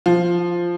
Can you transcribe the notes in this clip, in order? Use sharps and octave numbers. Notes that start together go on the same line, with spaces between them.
F3